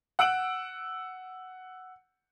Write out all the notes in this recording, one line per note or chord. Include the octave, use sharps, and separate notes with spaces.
F#5 E6 D7 F#7